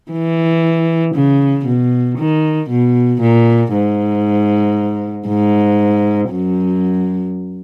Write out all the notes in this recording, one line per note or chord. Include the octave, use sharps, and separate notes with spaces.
E3
C#3
B2
D#3
B2
A#2
G#2
G#2
F#2